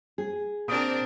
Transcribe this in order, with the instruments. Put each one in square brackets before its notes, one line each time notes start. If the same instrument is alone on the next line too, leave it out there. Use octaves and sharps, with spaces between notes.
[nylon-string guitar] G#4
[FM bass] A#2 [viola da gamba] C4 D4 A#4 [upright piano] D#6 D7